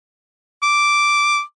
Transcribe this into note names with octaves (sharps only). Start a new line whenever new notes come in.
D6